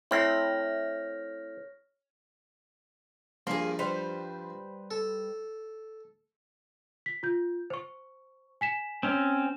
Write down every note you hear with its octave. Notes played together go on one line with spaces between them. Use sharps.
A3 C4 E4 C#5 F6 A#6
G2 F3 A#3 G#4
G3 B4 C5
A4
B6
F4 G6
C5 C#6
G#5 B6 E7
C4 C#4